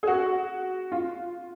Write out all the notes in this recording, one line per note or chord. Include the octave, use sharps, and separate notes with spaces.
G#4
F#4
F4